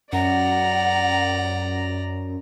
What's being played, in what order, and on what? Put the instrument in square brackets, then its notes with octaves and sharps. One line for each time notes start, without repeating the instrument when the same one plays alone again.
[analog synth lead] F#2 [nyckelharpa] D5 A#5 [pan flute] F#5